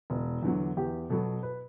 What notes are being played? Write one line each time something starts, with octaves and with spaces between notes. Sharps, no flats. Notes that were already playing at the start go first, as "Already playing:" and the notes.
E1
E2 D3 F#3
E2 G4
B2 F#3 B3 A4
B4